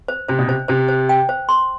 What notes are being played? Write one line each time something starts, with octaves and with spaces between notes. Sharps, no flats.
C5
C3 C5
B2
C3 C5
C3 C5
C5
G5
C5
C6